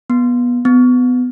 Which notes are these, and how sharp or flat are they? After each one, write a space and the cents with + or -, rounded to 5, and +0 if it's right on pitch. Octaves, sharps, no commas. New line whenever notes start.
B3 -20
B3 +20